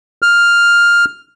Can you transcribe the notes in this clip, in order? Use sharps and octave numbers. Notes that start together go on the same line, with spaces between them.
F6